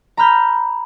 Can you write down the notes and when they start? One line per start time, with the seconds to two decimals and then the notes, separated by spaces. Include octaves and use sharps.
0.17 A#5 B5 F6 G6